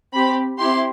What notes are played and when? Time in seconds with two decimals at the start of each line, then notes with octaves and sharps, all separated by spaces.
0.13 C4 G4 B5
0.59 C4 E4 G4 C6